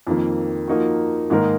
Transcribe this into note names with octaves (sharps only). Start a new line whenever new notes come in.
F2 D#3 A#3
F3 A#3 D#4 F#4
G#2 D#3 A#3 D#4 A#4